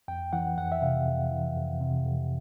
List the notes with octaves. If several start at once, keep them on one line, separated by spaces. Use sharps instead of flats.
F2 G5
E3 F#5
F2 F#5
E5
C3 F5
F2
E3
F2
C3
F2